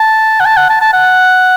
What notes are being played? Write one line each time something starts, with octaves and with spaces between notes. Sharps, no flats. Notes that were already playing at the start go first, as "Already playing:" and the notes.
Already playing: A5
F#5
A5
F#5
A5
A5
F#5